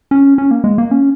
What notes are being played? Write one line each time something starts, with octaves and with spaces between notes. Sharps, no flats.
C#4
C#4
A#3
G#3
A#3
C#4